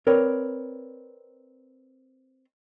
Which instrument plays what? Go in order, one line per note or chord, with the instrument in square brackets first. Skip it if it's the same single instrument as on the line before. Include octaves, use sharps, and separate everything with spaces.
[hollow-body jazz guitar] C4 A#4 B4 C#5 D5